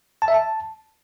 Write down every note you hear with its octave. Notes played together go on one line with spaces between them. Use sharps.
A5
E5
A5